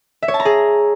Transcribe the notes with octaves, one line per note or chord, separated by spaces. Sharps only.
E5
C#5
A5
A#5
G#4